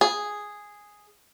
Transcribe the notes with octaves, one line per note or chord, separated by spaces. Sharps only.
G#4